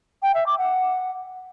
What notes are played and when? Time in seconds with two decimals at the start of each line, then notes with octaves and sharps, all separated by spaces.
0.23 G5
0.34 E5
0.46 D6
0.58 F#5